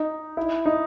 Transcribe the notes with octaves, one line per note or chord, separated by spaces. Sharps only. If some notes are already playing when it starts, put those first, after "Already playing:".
Already playing: D#4
E4
D#4